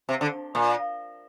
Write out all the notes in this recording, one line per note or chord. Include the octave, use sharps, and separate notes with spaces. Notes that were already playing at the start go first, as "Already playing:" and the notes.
C3
D3
A#2